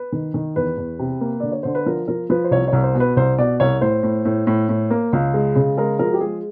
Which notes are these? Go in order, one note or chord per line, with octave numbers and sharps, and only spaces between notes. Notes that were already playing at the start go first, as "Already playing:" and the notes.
Already playing: B4
D#3
D#3
E2 B4
E2
C3
A#3
D3 D5
C#5
D3 C5
B4
F3 A#4
F3 A#4
F3 B4
C5
C2 C#5
C#5
C2
C5
B2
B4
C2 C5
B2 D5
C2 C#5
A2 C5
A2
A2
A2
A2
A#3
C#2
G#3
C#3
G#3 A#4
F3 A#4
F#4
G4
G#3 G#4